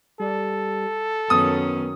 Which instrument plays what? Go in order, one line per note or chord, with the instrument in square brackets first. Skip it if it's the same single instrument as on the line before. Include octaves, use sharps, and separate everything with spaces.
[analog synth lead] G3 [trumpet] A4
[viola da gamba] F#2 D#3 C#4 [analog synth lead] B3 [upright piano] D#6